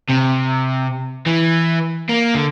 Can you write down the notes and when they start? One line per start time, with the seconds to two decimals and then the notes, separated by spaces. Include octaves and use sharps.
0.09 C3
1.27 E3
2.09 A#3
2.34 D3